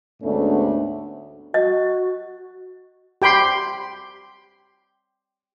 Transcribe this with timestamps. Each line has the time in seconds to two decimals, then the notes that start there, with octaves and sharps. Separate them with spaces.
0.22 D2 G#2 A3 B3 C#4 D4
1.54 F#4 D#5
3.22 G4 G5 B5 C6